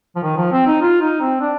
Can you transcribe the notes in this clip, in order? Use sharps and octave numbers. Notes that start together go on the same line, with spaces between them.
F3
D#3
F3
C4
D#4
F4
D#4
C4
D4